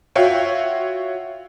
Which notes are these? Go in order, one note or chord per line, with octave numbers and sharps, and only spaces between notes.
F4 F#4 C#5 E5 F5 G5